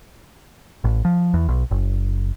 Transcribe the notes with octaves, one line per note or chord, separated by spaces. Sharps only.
A1
F3
E2
B1
F#1